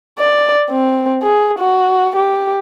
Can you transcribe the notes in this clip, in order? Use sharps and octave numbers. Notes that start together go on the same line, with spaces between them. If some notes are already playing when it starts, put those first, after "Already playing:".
D5
C4
G#4
F#4
G4